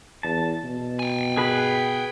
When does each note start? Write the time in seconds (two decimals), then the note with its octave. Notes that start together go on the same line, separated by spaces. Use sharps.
0.23 E2 A5
0.64 B2
0.99 G5 G#5
1.37 G#4 B4 B5